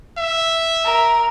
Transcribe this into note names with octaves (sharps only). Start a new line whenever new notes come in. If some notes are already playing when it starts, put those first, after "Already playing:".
E5
A#4